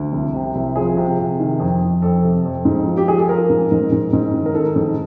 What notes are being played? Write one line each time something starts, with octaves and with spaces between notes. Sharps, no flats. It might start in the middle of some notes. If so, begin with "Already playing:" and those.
Already playing: D2
C2
C3
C2
F3 G#4
C3
C3
D#3
F2
F2
F2 A4
C3
F2
G#2
F3
G4
F3 G#4
A4
F3 A#4
G#2
G#2
G#2
G#2
D#3
A#4
D#3 A4
G#2